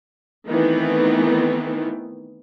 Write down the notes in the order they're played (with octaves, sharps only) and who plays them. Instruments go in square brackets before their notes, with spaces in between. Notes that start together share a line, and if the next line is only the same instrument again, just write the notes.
[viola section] D#3 E3 A3 B3 C4